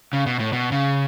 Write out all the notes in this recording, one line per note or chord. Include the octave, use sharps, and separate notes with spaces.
C#3
B2
A2
B2
C#3